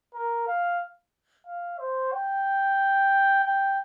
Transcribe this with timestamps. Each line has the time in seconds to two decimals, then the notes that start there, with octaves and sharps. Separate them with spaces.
0.14 A#4
0.48 F5
1.47 F5
1.79 C5
2.13 G5
3.45 G5